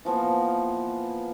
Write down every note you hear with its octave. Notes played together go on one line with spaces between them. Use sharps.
E3 F3 A#3 B3